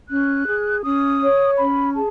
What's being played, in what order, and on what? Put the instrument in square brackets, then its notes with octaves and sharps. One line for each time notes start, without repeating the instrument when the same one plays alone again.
[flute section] C#4 F#6
G#4
C#4 D#6
C#5
C#4 B5
G#4 A5